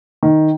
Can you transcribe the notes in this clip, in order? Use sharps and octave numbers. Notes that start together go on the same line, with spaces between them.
D#3